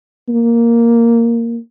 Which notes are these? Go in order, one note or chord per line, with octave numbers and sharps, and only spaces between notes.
A#3